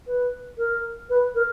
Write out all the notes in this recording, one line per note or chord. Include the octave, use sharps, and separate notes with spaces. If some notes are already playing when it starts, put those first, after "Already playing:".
B4
A#4
B4
A#4